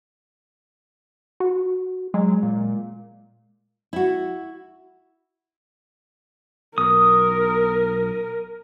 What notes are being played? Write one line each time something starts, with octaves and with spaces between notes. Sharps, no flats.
F#4
F#3 G#3
A#2
E4 F#4
B1 A#4 D#6